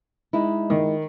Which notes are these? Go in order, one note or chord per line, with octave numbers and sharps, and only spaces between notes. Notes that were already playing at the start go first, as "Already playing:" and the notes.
G#3 D#4 E4
D#3